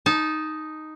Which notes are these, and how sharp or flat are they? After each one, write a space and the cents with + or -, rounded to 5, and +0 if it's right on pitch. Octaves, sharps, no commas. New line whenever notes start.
D#4 +0 A5 -25